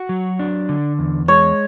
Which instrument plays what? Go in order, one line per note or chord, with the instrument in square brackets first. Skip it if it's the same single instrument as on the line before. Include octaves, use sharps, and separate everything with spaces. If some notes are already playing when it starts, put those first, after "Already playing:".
Already playing: [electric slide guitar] F#4
F#3
D4
D3
E2
[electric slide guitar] G#3 [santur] C#5